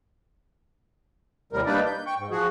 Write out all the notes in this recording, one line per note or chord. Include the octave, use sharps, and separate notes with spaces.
D#2 A2 C3 G3 A#4
G3 A#3 D4 D#4 B4 D5
G6
G5 C#6
G#2
F3 F#4 G#4